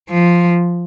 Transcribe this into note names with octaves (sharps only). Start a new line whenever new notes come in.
F3